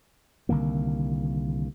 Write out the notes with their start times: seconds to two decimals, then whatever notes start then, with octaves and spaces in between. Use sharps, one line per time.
0.49 C2 D3 D#3 A#3